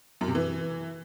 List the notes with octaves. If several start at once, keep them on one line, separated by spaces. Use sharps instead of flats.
F#2
C3
E3